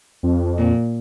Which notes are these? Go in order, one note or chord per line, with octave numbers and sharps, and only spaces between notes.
F2
A#2